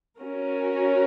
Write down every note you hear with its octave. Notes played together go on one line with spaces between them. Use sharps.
C#4 F#4 A#4